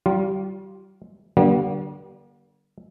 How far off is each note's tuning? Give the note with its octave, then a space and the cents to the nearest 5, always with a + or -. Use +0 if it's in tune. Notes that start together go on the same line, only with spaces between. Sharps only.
G3 -35 F4 +0
D3 +0 G3 -40 A#3 +45